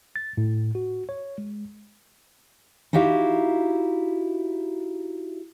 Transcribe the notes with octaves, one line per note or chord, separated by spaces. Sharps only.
A6
A2
F#4
C#5
G#3
D#4 E4 F#4 G4 F5